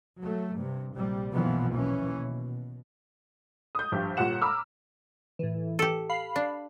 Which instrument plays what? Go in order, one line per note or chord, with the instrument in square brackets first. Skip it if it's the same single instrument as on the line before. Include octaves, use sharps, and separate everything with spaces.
[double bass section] F#3 A3
G2 C3
A#1 C3 G3
B1 F#2 A#2 E3 F3 B3
D#2 E3 C#4
B2
[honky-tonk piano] D#6 G6
A#1 G2 G4
G1 A#2 F4 G4 F#5 E7
A#5 B5 D6 E6 F6
[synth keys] A2 E3
[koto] G4 A4
[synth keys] F5 B5 C7
[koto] D4